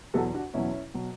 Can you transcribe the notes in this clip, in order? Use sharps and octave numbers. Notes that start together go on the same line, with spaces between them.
E2 B2 F#3 F#4 A4
D4 F#4
E2 B2 F#3 C#4 E4
B2 F#3